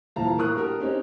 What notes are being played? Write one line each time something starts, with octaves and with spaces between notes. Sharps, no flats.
D#1 E3 F3 F5 A5 A#5
A2 A#4 C#6 D#6 F#6
D4 F#4 G4 A#4
C4 C#4 D#4 G4